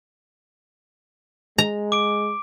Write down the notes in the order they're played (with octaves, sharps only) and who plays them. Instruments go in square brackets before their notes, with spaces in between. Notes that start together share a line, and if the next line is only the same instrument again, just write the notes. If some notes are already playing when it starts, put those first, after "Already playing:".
[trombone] G#3 [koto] A#5
[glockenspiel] D6 D7